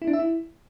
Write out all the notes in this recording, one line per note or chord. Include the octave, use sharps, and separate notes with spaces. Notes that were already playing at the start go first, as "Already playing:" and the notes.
E4
D4
E5
E4